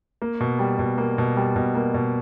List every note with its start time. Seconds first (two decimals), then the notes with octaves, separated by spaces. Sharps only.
0.22 A#3
0.40 B2
0.59 G3
0.79 B2
0.98 A#3
1.18 B2
1.36 G3
1.56 B2
1.75 A#3
1.94 B2